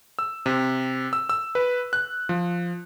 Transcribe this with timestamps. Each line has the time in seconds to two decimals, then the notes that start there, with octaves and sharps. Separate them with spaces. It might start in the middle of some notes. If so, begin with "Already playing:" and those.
0.19 E6
0.46 C3
1.13 E6
1.29 E6
1.55 B4
1.93 F#6
2.29 F3